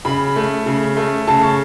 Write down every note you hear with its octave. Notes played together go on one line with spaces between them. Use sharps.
C#3 B5
A3
C#3
A3
C#3 A5
C#6